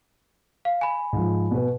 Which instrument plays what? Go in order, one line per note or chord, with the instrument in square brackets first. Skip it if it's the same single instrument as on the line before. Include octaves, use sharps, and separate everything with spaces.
[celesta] F5
G#5 B5
[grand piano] G#2 F3
B2 B4